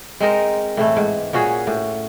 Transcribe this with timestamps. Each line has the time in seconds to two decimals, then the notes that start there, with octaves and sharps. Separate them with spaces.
0.20 G#3 C4 D#4 A#4
0.77 A2 E3 A3
0.97 G#2
1.33 A#2 C#4 F#4 G#4
1.67 A2